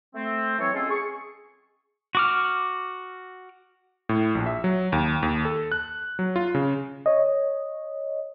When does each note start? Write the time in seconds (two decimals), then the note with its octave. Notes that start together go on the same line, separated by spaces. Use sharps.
0.15 A3 C4
0.59 E3 F#3 C4 A4 C#5
0.74 G#3 C4 C#4 E4 F4 A4
0.90 G#4 C#6
2.15 F#4 D6 F6
4.09 A2
4.35 A#1
4.46 E5
4.64 F#3
4.92 D#2
5.23 D#2
5.45 A4
5.72 F#6
6.19 F#3
6.36 F4
6.55 C#3
7.06 C#5 D#5